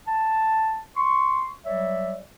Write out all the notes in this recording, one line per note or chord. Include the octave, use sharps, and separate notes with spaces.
A5
C6 C#6
F#3 G3 C#5 D5 E5